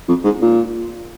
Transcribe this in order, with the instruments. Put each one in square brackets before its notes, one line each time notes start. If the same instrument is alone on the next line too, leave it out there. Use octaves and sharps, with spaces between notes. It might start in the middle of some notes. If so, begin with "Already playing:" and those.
[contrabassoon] F2
G#2
A#2